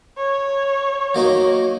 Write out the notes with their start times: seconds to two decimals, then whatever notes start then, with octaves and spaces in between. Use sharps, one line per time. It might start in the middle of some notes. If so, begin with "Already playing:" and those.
0.17 C#5
1.15 F#3 A#3 D#4